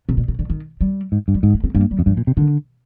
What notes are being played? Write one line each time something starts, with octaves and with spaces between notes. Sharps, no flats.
C3
A#2
C3
D3
D#3
G3
G#2
G2
G3
G#2 G#3
G#3
C4
G2 A#3
G3
F2
G2 F3
A#2
C3
D3 D#3